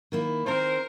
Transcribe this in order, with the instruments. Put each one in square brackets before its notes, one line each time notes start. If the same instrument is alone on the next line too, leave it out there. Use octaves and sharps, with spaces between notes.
[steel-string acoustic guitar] D#3 A#3 E4
[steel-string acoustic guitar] D#3 C4 [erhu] A#4 [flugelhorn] C5